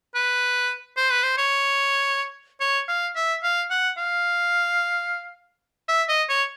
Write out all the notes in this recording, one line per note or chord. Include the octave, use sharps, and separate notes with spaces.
B4
C5
B4
C5
C#5
C#5
F5
E5
F5
F#5
F5
E5
D#5
C#5